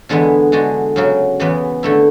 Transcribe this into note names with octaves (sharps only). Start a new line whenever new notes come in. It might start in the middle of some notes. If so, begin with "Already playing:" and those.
E2 D3 G#3 B3 E4
D3 G#3 D4 F#4
F#2 C#3 F#3
E2 C#3 E3 B3
D3 A3 E4